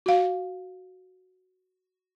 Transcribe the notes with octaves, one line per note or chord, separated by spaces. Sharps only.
F#4 F5